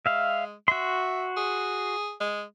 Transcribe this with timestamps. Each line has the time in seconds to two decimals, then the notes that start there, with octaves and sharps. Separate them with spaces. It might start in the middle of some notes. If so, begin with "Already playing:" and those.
0.06 G#3 E5 F5
0.68 F#4 E5 C6
1.37 G#4
2.21 G#3